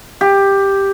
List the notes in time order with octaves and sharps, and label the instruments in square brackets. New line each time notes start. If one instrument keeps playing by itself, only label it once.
[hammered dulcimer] G4